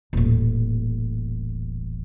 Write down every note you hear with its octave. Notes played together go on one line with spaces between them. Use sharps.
D#1 A1